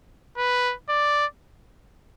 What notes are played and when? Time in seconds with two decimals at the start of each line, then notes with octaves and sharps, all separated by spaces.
0.37 B4
0.89 D5